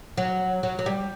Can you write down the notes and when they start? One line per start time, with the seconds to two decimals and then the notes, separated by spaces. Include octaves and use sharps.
0.17 F#3
0.63 F#3
0.79 F#3
0.86 G3